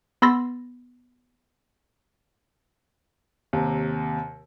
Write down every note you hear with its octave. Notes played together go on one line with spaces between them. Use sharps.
B3 B5 C6 E6 A6 A#6
D#2 C3